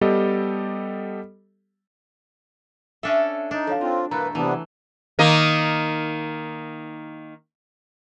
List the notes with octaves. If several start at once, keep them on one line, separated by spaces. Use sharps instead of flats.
G3 B3 G4 A4 D#5
C#4 D4 A4 E5
D4 D#4
F3 F#3 A4 C#5 F5
C4 D#4 F4
G2 B2 E3 A3 A#3 B4 A#5
C3 E3 F#3 G#3 B3 D4
D#3 A#3 D#5